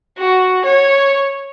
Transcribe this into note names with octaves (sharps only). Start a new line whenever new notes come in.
F#4
C#5